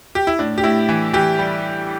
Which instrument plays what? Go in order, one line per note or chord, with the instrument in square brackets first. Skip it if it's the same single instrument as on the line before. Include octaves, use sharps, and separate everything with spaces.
[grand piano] G4
E4
A2 D4
G4
A2 E4
E3
E3 G4
G3